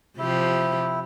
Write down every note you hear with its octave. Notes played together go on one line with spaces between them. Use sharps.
C3 F3 E4 G4